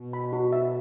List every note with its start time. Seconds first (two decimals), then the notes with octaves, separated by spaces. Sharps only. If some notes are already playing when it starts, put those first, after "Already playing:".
Already playing: B2
0.13 B5
0.33 F#4
0.52 E5